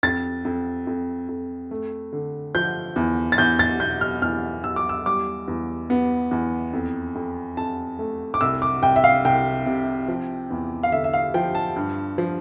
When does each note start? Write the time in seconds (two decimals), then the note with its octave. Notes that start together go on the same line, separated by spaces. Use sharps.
0.03 F2 A6
0.45 F2
0.87 F2
1.29 F2
1.71 A3
2.13 D3
2.55 F3 G6
2.96 E2
3.32 A6
3.38 E2 G6
3.59 A6
3.80 B2 G6
4.01 F6
4.22 E2 F6
4.64 E2 E6
4.76 D6
4.89 E6
5.06 G3 D6
5.48 E2
5.90 B3
6.31 E2
6.73 F2
7.15 F2
7.57 F2 A5
7.99 A3
8.34 D6
8.41 C2 E6
8.62 D6
8.83 C2 G5
8.96 E5
9.04 F5
9.25 C2 G5
9.66 C3
10.08 F3
10.50 E2
10.83 F5
10.92 D3 E5
11.04 E5
11.14 F5
11.34 F3 G5
11.55 A5
11.76 G2
12.18 F3